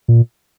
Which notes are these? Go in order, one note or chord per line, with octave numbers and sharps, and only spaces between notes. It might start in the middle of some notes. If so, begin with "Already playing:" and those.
A#2